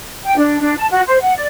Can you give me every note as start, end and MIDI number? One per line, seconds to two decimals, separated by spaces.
0.25 0.36 79
0.37 0.59 62
0.59 0.74 62
0.76 0.86 81
0.90 1.01 66
1.06 1.16 72
1.20 1.31 78
1.35 1.47 74